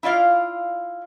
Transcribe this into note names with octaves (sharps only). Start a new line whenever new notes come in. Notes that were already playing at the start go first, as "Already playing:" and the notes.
E4 F4 D5 F5